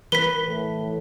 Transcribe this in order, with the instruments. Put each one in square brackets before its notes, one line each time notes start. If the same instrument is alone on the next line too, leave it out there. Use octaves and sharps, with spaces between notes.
[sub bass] E3 [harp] B4 [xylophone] B6 G7
[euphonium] A2